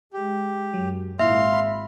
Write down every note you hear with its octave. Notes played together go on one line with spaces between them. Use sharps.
G#3 G4
F#2 F#3
G#1 A#2 E4 E5 F5 C6
B5